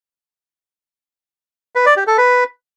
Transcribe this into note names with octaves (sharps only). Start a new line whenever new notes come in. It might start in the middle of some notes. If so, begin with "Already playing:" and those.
B4
D5
G4
A4
B4